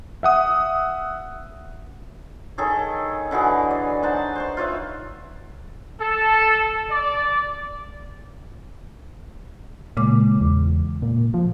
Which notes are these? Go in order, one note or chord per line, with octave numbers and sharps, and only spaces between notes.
E5 F#5 D#6
D#3 G#4 A4 C#5
D3 E3 F#4 G#4
D5
D#4 C5 F#5 A5
C5 C6 C#6
F4 B4 C#5 E5
A4
D5
A#2 C#3 G#3 D6
E2
A#2
F3